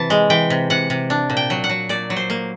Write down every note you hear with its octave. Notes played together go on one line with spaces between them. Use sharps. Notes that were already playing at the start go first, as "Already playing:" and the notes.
Already playing: C3 E3 A5
G#3
E3 G5
C3
C3 F#5
C3
D4
A#2
G5
F#3
F#5
F#3
A#2 D5
F#3
C5
A#3